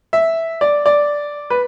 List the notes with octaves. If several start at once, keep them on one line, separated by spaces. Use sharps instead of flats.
E5
D5
D5
B4